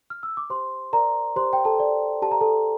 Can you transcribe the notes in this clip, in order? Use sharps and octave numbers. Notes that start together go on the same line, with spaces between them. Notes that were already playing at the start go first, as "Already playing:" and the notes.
F6
E6
D6
G4 C5 C6
A#4 D5 A#5
G4 C5 C6
G5
A4 A5
D5
G4 A5
A#5
A4 A5